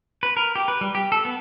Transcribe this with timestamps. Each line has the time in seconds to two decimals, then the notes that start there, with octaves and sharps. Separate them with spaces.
0.23 B4
0.37 A#4
0.56 G4
0.68 B4
0.81 G3
0.95 G4
1.12 A4
1.25 B3